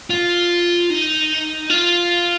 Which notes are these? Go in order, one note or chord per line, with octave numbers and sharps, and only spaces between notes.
F4
D#4
F4